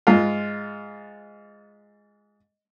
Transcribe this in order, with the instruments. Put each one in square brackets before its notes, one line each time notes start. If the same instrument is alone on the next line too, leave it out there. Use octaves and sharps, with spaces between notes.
[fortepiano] G#2 F4